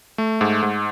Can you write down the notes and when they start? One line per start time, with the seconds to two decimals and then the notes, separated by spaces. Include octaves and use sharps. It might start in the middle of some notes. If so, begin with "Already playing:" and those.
0.18 A3
0.41 G#2
0.62 G#2